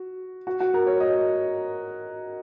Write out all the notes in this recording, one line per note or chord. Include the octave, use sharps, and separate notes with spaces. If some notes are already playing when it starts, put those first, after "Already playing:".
Already playing: F#4
F#4
F#4
A#4
C#5
D#5